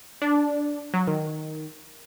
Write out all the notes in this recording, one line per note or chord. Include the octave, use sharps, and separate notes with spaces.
D4
F#3
D#3